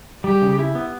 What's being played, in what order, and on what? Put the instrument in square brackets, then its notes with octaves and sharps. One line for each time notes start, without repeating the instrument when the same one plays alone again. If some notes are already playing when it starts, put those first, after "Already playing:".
[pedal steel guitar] G3 [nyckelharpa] G4
[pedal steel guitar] C#3
E4
B3